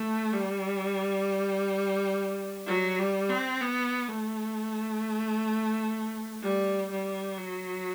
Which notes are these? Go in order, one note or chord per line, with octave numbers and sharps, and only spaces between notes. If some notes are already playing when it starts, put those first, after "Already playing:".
Already playing: A3
G3
F#3
G3
C4
B3
A3
G3
G3
F#3